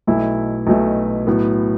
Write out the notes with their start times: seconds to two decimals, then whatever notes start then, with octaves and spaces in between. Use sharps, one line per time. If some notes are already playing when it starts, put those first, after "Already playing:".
0.07 B1 B2 A3 E4
0.67 B1 B2 A3 E4
1.27 A2 F#3 B3